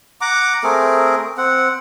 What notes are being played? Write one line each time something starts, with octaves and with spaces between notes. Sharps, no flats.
F#5 A#5 D6
A3 C4 G#4 A#4
C4 F#5